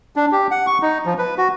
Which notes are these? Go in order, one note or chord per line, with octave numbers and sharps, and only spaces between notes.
D4
G4
F#5
C#6
D#4
F3
B4
F#4